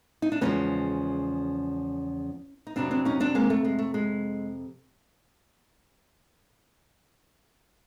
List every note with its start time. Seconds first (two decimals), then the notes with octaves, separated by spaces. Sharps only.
0.22 D#4
0.32 D4
0.41 E2 C#3 F3 G#3 B3 C#4
2.67 D#4
2.76 F2 C3 D#3 F#3 C4 D4
2.91 C4 D4
3.05 C#4 D#4
3.20 C4 D4
3.35 G#3 A#3
3.50 A3
3.64 G#3
3.79 A3
3.94 G#3